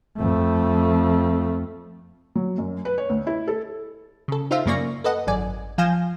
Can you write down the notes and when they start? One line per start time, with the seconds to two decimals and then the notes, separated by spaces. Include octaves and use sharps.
0.18 F2 A3
2.35 F#3
2.58 F#2
2.85 B4
2.98 C#5
3.09 D2
3.27 E4
3.48 A4
4.28 C#3 A4
4.51 D#4 F4 C5 E5 F5
4.66 F#2 C#3 A#3 D5 C#6 A#6
5.04 A4 B4 D#5 F#5
5.27 G#1 F#2 D5 G#5
5.78 F3 F5 G#5 G6 A#6 E7